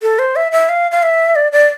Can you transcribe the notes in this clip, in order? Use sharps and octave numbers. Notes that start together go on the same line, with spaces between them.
A4
C5
E5
E5
F5
F5
E5
D5
D5